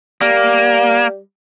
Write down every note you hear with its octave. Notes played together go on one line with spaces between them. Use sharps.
G3 A#3